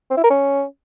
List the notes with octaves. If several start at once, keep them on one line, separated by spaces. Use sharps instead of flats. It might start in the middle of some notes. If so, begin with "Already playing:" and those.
C4
E4
A#4
C#4